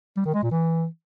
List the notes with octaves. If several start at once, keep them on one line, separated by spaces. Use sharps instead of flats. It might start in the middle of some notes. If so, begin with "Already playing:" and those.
G3
D#3
G#3
A#2
E3